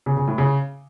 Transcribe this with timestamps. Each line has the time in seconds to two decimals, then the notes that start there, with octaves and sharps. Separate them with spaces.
0.06 C#3
0.17 C#3
0.28 A2
0.38 C#3